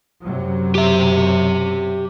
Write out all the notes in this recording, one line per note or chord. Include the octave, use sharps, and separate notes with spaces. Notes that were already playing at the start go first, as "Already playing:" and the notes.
F#2 C3 F#3
G4 E5